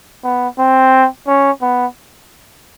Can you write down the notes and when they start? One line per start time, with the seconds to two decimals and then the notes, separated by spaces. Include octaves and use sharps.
0.24 B3
0.59 C4
1.27 C#4
1.62 B3